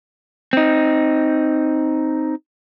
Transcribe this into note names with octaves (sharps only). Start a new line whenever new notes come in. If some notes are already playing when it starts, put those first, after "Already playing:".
C4 D#4